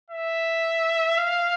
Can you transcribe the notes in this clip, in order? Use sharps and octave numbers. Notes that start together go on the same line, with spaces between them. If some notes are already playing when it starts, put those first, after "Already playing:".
E5
F5